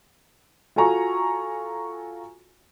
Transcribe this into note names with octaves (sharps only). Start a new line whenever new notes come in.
F4 F#4 A4 G#5 A#5 C#6